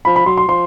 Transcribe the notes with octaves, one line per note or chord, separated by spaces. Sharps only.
F3 B5
B5
F#3 C6
C6
F3 C6